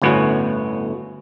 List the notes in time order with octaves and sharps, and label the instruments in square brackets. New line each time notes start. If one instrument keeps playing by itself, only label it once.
[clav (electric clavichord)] G1 D2 A2 B3 C#4 F#4